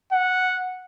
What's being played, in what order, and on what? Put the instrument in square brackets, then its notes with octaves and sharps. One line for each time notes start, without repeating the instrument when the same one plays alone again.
[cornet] F#5